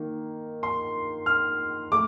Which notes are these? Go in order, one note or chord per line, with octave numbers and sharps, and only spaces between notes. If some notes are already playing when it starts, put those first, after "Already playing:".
Already playing: D#3 A#3
C6
F6
A3 D6